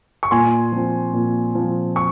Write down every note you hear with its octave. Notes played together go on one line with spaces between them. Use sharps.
C#6
A#2 G#5 C6
F3 C4
A#2
F3 C4
C#6